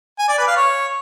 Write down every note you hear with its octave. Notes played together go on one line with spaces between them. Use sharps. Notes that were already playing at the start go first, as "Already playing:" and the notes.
G#5
D5
B4
F5
C#5